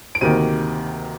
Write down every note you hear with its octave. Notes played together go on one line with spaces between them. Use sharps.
D7
D2 C3 D#3 A#3 D#7